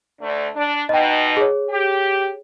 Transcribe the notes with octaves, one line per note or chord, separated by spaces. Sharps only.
D2 A3 D4
D4
B2 D#4 D#5 G5
G#4 C#5
G4